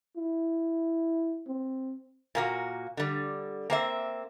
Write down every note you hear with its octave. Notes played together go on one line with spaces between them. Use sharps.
E4
C4
A#2 A#3 F#4
D3 G3
A#3 C4 E5